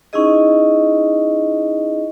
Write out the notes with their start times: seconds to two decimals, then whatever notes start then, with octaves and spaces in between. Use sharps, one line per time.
0.13 C#4 D#4 E4 G#4 D#5